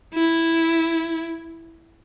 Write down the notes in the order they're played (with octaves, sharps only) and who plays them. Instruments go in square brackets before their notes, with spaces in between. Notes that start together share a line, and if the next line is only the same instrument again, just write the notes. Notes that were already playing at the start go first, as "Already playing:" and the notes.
[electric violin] E4